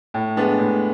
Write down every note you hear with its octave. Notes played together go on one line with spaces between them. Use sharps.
A2
G#3 B3 D4
A2